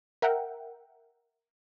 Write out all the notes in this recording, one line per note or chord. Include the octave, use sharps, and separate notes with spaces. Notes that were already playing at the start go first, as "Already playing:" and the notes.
A#4 E5 F#5 G5